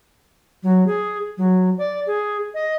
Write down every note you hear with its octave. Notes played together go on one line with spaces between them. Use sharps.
F#3
G#4
F#3
D5
G#4
D#5